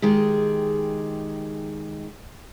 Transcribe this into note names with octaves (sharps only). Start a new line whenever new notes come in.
D#3 G#3 G4 G#4